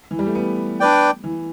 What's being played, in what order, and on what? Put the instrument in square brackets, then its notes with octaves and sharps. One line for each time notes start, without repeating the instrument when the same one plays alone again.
[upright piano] E3
G3
A3
B3
[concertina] D4 B4 D5 G5
[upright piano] E3